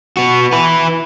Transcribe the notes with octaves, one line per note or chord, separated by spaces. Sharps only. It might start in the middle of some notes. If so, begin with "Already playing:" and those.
B3 F#4
E4 B4